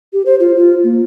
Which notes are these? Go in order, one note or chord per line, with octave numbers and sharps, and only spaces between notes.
G4
C5
F4
F4
A#3